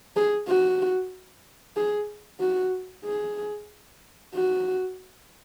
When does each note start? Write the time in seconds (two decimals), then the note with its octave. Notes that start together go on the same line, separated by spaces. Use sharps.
0.16 G#4
0.48 F#4
1.77 G#4
2.40 F#4
3.05 G#4
4.35 F#4